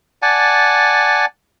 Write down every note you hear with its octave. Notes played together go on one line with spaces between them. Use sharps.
D5 F#5 G#5 A5